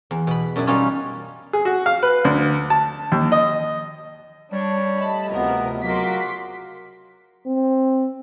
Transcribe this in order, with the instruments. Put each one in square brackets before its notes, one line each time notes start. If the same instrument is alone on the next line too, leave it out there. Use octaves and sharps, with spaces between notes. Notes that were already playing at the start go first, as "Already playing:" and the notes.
[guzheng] E2
B2 B5
F#2 B2 D4 E4
B2 G3 C#4 D#4 F4 C#5
[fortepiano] G#4
F#4
F5
B4
D2
A5
D#2
D#5
[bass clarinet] G3 [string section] D4 [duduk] C#5
[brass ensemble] A3 G4 D#5 [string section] A5 B5
[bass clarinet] D2 [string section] C3 F3 A#4 [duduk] B3
[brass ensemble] C#3 F4 F#4 [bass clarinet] F#3 [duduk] A#4 [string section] C6 D6 B6
[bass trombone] C4